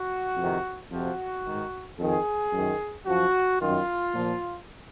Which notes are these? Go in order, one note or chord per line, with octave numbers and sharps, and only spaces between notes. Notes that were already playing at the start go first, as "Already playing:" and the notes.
Already playing: F#4
F2 C3 D#3
F2 C3 F3 F#4
G#2 D#3
F2 D#3 G#4
F#2 D#3
F#2 F3 F#4
F#2 D#3 F4
A#2 F3